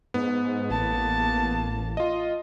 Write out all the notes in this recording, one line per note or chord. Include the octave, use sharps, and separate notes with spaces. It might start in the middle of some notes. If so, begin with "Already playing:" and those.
G#2 B3
A1 A#3 A5
F4 D#5